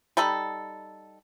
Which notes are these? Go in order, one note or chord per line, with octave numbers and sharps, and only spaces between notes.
G3 D#4 A4 B5